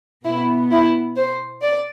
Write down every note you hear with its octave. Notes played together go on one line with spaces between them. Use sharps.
B2 B3 E4
E4
C5
D5